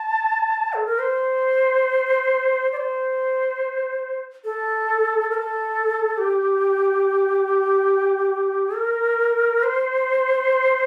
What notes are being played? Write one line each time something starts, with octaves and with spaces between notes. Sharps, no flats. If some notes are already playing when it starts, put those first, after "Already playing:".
Already playing: A5
A4
A#4
C5
D5
C5
A4
A#4
A4
G4
A#4
C5